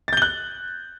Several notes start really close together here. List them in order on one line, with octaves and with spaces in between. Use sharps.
A6 G6 G7 F#6